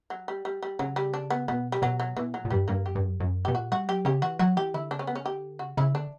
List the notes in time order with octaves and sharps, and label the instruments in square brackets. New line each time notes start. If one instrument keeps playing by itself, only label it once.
[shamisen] F#3
G3
G3
G3
[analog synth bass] C#3 [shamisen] F#3
[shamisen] G3
D4
B3
[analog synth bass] B2 [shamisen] B3
[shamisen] G3
[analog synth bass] B2 [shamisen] F#3
[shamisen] F#3
[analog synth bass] B2 [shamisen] E3
[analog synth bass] A#2 [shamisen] F#3
[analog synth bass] A#2
[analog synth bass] G2 [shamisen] G3
[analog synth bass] G2 [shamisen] A#3
[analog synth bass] F#2 [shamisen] G4
[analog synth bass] G2
F#2
F#2
[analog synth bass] B2 [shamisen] G4
[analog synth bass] A#2 [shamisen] F#4
[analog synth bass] G3 [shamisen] F#4
[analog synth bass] F#3 [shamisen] G4
[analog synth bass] C#3 [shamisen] G4
[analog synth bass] E3 [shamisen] F#4
[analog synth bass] F#3 [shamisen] F#4
[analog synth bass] E3 [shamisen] G4
[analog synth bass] D3 [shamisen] E4
[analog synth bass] C#3 [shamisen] D4
[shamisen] C#4
B3
C#4
[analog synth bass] D3 [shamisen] G4
[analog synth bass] C#3 [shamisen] F#4
[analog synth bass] C#3 [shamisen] E4
[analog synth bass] D3 [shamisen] D4